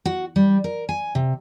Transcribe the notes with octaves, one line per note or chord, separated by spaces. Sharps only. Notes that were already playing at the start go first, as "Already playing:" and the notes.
F#4
G3
A#4
G#5
C3